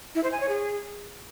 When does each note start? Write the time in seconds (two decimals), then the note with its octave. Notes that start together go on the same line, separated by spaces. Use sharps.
0.15 E4
0.23 C5
0.32 G#5
0.40 C#5
0.49 G#4